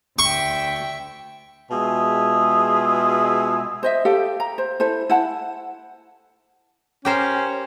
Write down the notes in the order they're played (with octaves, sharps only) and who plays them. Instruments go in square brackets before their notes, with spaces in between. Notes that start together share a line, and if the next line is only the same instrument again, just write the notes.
[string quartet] D2 E5 G5 [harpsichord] C#6
[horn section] B2 G#3 F4 G#4 E5
[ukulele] C5 D#5 E5
G4 A4 F5
A#5
C5
E4 A4 C5
E4 F#5 A5
[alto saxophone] C#4 [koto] G4 A#4 C5